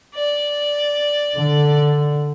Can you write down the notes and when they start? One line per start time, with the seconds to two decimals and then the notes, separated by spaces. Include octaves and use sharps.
0.15 D5
1.37 D3